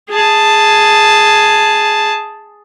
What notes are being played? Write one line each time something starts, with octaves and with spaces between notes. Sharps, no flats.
G#4 A5